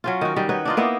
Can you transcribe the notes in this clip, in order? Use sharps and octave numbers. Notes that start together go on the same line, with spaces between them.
F#3 C#4 F4
D#3 F#4
D#3 G3
D#4 F#4 B4 C#5
D4 D#4 F4
A#3 B3 D#4 E4